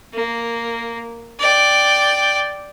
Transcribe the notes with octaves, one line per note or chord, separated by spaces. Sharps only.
A#3
D5 G5